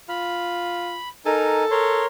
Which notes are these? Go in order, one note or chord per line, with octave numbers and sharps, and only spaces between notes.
F4 B5
D#4 A4 A#4 G#5
A#4 C#5 C6